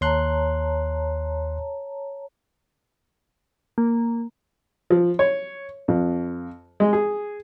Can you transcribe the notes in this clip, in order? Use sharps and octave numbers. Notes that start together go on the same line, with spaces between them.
D#2 C#5 A5 A#5 C6 F#6
A#3
F3
C#5
F2
G#3
G#4